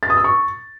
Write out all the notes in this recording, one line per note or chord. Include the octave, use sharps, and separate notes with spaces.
A6
D#6
E6
C#6